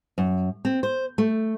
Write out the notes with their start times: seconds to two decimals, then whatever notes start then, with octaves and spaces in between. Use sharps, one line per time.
0.18 F#2
0.65 C4
0.83 C5
1.18 A3